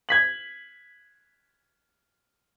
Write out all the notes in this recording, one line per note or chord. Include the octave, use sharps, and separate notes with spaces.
G#6 B6 F#7